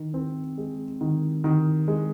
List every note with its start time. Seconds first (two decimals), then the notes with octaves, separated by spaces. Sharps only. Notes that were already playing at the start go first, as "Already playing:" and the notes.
Already playing: D#3
0.14 C4
0.58 G#3
1.01 D#3
1.44 D#3
1.88 G#3